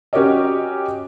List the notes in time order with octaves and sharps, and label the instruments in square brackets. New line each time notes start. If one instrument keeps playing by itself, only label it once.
[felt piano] C#4 F#4 G4 A#4 C#5 D#5